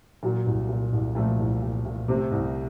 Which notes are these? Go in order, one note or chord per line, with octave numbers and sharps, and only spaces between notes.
A#2 F#3
C2
A#2
C2
A#2 F3 A3
C2
A#2
A#2
C3 A3 C4
C2